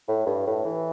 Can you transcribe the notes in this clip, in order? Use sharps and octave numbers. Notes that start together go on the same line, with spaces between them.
A2
G2
A2
E3